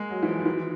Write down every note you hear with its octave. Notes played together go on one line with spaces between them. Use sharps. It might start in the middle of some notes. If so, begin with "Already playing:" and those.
Already playing: G#3 A#3
F#3
E3
F3
D#3
E3